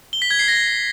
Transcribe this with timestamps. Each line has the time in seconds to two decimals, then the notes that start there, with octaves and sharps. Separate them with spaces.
0.13 G7
0.22 B6
0.31 G#6
0.39 C7
0.48 A#6